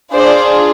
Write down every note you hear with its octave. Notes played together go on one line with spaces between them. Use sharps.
D4 F4 G#4 C5 D5